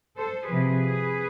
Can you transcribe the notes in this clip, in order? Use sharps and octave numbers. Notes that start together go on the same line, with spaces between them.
A4 C5
C3 F3 G#4 B4